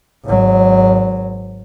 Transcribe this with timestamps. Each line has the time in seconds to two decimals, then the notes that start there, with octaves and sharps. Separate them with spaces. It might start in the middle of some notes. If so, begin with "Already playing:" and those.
0.24 G#1 F#3